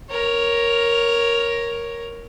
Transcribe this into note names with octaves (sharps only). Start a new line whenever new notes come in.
A#4 C#5